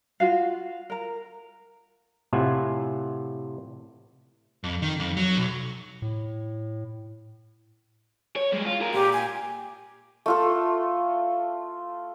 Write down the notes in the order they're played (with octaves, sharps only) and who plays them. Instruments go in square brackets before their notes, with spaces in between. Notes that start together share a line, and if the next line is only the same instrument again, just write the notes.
[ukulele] F4 F#4 F5
A#4 A#5
[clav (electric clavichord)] A2 C3 F4 E5 F#5 G#5
[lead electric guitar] F2
D#3
F2
F#3
B1
[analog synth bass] A2
[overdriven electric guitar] C#5
G3 G#3
F4
G#4 A#4
[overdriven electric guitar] A#2 [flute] G4
[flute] G#5
[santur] A3 F4 A4